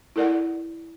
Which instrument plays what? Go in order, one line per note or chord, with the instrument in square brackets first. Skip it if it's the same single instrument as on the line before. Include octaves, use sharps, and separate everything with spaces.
[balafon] E4 A4 A#4 D5 F#5